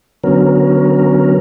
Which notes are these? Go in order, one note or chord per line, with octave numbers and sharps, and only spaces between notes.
D3 F#3 B3 C#4 A#4